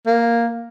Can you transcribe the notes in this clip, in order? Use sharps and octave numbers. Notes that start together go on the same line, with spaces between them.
A#3